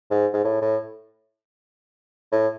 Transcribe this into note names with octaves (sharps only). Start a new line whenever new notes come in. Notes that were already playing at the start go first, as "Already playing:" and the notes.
G#2
G#2
A2
A2
A2